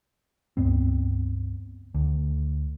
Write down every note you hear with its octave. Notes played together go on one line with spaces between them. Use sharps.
C#2 G2 B3 C4
D2